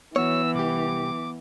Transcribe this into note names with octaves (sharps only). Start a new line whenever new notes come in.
E3 B3 F#4 C#5 E6
C2 G4 D6